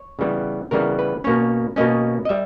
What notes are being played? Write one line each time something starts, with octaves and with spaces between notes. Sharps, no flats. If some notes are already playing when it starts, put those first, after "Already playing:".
Already playing: C#5
C#3 E3 G3 B3
C#3 E3 G3 B3 A#4
B4
B2 A#3 C#4 C#5
B2 A#3 C#4 D#5
D#5
G3 E5